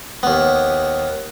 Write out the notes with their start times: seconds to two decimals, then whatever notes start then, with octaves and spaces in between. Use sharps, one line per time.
0.23 D#2 B3